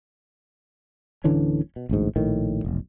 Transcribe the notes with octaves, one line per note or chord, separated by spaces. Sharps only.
D1 D3 E3 C#4
B2
A1 D2 G#2
A#1 A2 D#3
F1 B1